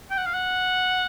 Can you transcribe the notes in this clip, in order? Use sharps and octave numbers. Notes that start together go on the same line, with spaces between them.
G5
F#5
F5
F#5